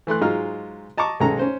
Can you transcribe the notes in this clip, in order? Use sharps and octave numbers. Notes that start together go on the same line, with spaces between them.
E3 A3 C6 F#6
G#2 F#3 G#3 F4 F6
D#5 A5 A#5 C#6 D6
B1 D#3 G#3 C#4 A4 A#5
C#4 C5